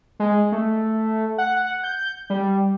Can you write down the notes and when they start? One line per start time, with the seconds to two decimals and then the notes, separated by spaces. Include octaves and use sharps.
0.20 G#3
0.52 A3
1.38 F#5
1.83 G6
2.30 G3